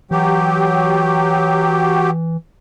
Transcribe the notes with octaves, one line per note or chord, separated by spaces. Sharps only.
E3 F#3 G4